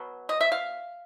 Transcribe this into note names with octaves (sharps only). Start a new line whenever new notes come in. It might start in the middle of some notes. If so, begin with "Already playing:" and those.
Already playing: B2 F#3
D#5
E5
F5